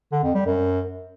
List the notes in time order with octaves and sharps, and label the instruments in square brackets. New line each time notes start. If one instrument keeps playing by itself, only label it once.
[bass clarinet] D3
F2
G3
F#2